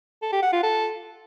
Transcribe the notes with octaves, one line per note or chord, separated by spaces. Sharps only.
A4
G4
F#5
F4
A4